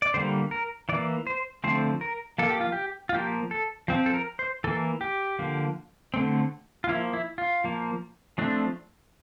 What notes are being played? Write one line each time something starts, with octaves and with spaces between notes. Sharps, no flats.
D5
D3 G3 A#3 C5
A#4
E3 A#3 D5
C5
D3 F3 A3 C4 C5
A#4
F3 A#3 A4
G4
F4
G4
F4
F3 A#3 G4
A4
F3 C4
A4
A#4
C5
E3 A#3 A4
G4
D3 F3 A#3
D3 A3 C4
F4
F3 A#3 E4
E4
F4
F3 A#3
F3 A3 C4 D4